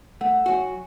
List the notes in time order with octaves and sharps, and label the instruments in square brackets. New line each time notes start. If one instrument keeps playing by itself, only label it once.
[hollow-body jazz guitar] A3 [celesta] F#5
[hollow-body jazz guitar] F#3 F#4 [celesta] G#5